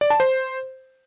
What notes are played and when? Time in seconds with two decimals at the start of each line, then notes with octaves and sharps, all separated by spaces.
0.01 D5
0.10 A5
0.20 C5